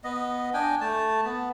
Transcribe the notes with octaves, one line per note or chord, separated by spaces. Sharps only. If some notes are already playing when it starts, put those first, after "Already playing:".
B3 D#5
D4 G5 G#5
A3 A5
B3